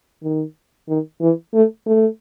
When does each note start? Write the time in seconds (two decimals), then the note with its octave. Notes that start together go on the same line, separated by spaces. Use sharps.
0.23 D#3
0.89 D#3
1.21 E3
1.54 A3
1.86 A3